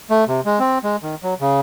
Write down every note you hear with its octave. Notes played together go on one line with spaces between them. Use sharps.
A3
C3
G#3
C4
G#3
D#3
F#3
C#3